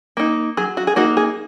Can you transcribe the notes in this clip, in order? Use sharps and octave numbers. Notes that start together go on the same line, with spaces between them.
A#3 D#4
F#3 G#4
F#4
G#4
A#3 D#4 F#4
G#4